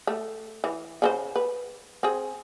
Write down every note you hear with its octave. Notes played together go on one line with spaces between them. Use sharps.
A3
E3
C#3 F4 C5
B4
C4 G#4